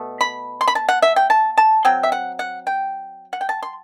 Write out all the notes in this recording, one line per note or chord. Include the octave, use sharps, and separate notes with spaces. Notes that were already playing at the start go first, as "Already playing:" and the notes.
Already playing: B2 A3
B5
C6
B5
A5
F#5
E5
G5
A5
A5
F#3 C4 G5
E5
F#5
F#5
G5
F#5
G5
A5
C6